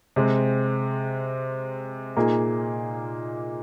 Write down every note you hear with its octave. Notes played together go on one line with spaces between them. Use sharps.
C3 G#3 C4
A#2 A#3 D#4 G#4